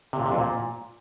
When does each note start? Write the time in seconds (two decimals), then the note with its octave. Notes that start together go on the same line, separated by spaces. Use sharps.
0.13 C3
0.19 A#2
0.26 C3
0.32 F2
0.38 A#2